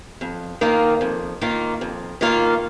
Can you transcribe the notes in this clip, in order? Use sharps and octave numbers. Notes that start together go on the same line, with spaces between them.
F2
D#3 A#3 F4
F2
D#3 A#3 F4
F2
D#3 A#3 F4